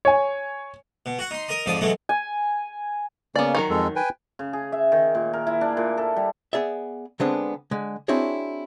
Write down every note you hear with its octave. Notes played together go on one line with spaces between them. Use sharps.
C#5 G#5
B2
F#4 F#5
D#4 C6
A#4 D#5 A#5 D#6
F2 G#2 F3 D5 D#6
B2 E3 F#3 G#3 A3
G#5
C#3 A#3 B3 C#4 D5
D#3 F#3 A#4
F2 G#3 A4
B4 G5 G#5
C#3
G#4
E5
D#3
A#2
A#4
E4
D4
A#2
A4
G3
B3 G#4 D5 E5
D3 G#3 B3 C4 D4 G#4
D3 G#3
C4 D4 E4 F#4 G#4 C#5